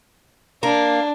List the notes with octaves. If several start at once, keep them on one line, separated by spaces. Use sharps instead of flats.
A#3 D4